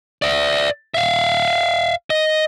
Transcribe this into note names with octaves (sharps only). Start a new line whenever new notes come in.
D5 E5
E5 F5
D#5